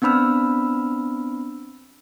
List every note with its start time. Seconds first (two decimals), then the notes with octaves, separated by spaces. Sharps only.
0.02 B3 C4 D4 B5 E6 F6